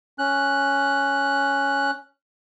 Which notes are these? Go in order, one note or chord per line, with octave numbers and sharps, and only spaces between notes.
C#4 F#6